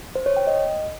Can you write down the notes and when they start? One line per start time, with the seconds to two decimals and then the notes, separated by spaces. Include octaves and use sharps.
0.15 C5
0.26 C#5
0.37 G5
0.47 D#5